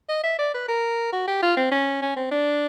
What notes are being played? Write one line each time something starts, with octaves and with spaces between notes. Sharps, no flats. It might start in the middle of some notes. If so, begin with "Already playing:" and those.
D#5
E5
D5
B4
A#4
F#4
G4
F4
C4
C#4
C#4
C4
D4